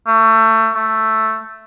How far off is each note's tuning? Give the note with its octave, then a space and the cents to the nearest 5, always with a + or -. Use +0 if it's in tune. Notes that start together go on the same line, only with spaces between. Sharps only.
A3 +25
A3 +5